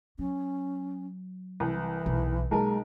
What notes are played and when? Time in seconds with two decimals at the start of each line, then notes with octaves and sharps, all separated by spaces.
0.19 F#3 C#4
1.60 C2 E3
2.06 B1
2.51 B1 G#3 A#3 G#4 A#4 A5